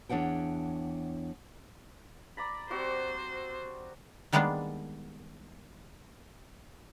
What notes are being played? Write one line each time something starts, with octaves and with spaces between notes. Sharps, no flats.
E2 D4 C#5 F#5 G5
D5 A#5 B5
G3 C4 F#4 C5
D#3 G3 G#3 A#3 B3 D4